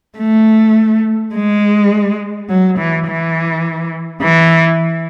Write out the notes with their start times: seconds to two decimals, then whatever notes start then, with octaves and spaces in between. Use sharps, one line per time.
0.18 A3
1.35 G#3
2.49 F#3
2.78 E3
3.07 E3
4.22 E3